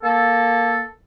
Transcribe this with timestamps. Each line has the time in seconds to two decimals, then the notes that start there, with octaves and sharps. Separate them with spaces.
0.03 A#3 A4